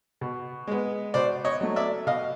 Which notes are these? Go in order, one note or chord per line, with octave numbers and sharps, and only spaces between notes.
B2
G#3 B3
B2 C5 D5
C#5 D#5
F#3 A3
D5 E5
B2 D#5 F5